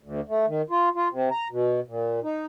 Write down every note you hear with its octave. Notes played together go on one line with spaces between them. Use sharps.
D2
A3
D#3
F4
F4
C3
A#5
B2
A#2
D#4